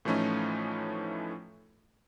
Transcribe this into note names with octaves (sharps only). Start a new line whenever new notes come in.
A2 E3 F3 A3 C#4 D#4